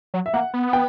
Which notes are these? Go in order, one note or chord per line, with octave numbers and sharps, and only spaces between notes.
F#3
E5
A#3 F#5
B3
G5